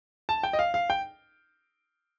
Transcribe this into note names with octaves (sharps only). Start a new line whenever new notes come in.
A5
G5
D#5
F5
F5
G5